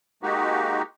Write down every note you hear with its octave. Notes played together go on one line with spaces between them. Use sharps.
G#3 A#3 D#4 F#4 G4